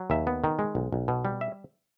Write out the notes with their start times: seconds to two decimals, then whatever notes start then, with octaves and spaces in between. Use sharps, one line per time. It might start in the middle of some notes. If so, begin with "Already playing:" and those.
Already playing: F#3
0.10 D#2 E5
0.27 B3
0.44 D#3
0.59 G#3
0.75 B1
0.92 B1
1.08 B2
1.25 G3
1.41 E5